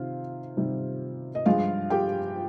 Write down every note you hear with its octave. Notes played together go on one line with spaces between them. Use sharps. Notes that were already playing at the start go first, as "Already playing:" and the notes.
Already playing: C3 D#3 F4 F5
C3 D#3 G3
D#5
G2 F3 G#3 F4 F5
G4 G5